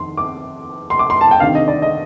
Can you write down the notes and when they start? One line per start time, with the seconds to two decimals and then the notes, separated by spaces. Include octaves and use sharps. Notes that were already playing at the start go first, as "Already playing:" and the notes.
Already playing: F2 D#3 C6
0.17 D6
0.90 C6
0.99 D6
1.10 C6
1.21 A5
1.31 G5
1.40 D2 C3 D#3 F5
1.55 D#5
1.68 D5
1.82 D#5